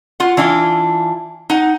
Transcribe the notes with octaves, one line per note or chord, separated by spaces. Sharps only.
F4 F#5
E3 D4 E4 F4
D#4 F#5